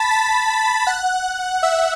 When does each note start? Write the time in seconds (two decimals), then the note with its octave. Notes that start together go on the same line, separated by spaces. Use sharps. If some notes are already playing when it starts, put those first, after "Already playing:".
Already playing: A5 B5 A6 B6
0.11 A5 A6
0.87 F#5 F#6
1.63 E5 E6